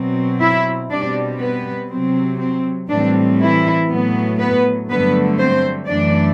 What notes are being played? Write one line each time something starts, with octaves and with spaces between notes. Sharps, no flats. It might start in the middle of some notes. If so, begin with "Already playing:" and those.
Already playing: B2 F#3 C4
E4 E5
B2 G3 C4 D4 D5
B3 B4
C3 F#3 C4
C4
A2 E3 G3 C4 D4
E3 E4
A2 F#3 B3
B3 B4
G2 D3 F#3 A3 B3 B4
C4 C5
F#2 E3 A3 D4 D5